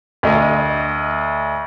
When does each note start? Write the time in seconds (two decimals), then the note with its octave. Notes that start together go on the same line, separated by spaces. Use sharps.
0.23 D2 D#5